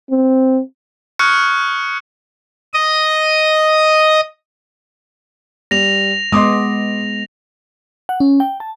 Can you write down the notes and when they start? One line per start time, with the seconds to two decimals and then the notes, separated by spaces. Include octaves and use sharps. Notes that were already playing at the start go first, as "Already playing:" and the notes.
0.10 C4
1.19 C#6 D#6 F6 F#6 G#6 C#7
2.74 D#5 D#6
5.71 G3 A#6 F7
6.32 G#3 B3 D#5 C6 D6 D#6
8.09 F#5
8.20 C#4
8.40 G5
8.60 A5